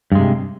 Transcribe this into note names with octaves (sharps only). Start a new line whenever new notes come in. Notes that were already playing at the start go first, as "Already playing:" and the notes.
G2 C3 G#3